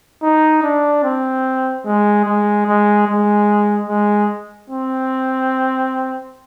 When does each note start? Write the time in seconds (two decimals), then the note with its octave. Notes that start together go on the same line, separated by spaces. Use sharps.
0.22 D#4
0.63 D4
1.04 C4
1.86 G#3
2.26 G#3
2.67 G#3
3.07 G#3
3.88 G#3
4.70 C4